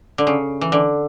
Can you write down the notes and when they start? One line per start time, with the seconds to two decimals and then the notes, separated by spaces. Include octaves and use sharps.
0.18 D3
0.27 C#3
0.61 E3
0.72 D3